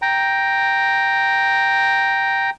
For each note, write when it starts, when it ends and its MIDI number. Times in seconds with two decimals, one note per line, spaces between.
0.02 2.50 79
0.02 2.50 82